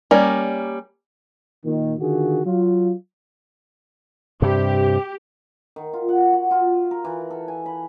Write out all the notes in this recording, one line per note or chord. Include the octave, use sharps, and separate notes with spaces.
G3 A#3 C#4 A#4 D5
A#2 D#3
D3 D#3 F4 F#4 G#4
F#3 F4
G2 C3 G4
D#3
F4
F#5
F#4
F4
A#4
E3
A4
G#5
B5